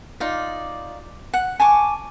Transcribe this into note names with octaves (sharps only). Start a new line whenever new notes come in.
D#4 F4 D5
F#5
G#5 A5 C#6 D6